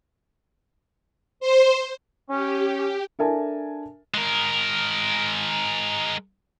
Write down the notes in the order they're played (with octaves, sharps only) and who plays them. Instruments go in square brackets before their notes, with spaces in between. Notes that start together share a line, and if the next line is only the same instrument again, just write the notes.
[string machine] C5
[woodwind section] C#4 [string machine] G4
[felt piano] D4 A4 A#4 E5 G#5 A5
[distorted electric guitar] G#3 A#4